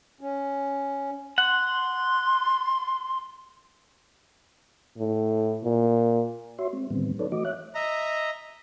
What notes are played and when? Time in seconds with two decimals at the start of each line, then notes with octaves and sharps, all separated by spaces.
0.21 C#4
1.38 F#5 C6
4.98 A2
5.63 A#2
6.59 F#4 C#5 E5 C6
6.73 G#3 C4
6.91 A2 D3 D#3 G3 B3 C4
7.19 F#3 D#4 A4 B4 C#5 D5
7.32 E3 A3 F#4 D#5 D6
7.45 C#5 E5 F#6
7.75 D#5 E5 A#5